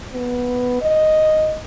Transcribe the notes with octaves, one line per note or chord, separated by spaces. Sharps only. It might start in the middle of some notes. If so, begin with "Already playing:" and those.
B3
D#5